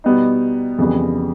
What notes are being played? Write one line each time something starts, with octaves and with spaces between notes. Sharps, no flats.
B2 G3 B3 D#4
F2 C#3 E3 G3 B3